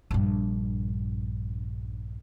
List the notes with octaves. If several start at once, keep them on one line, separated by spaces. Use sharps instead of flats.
A#1 G2